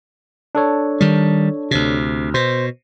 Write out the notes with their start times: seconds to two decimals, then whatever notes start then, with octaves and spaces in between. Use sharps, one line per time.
0.55 D4 A4 C#5
1.01 D#3 G3
1.71 D2 C3
2.34 B2 C5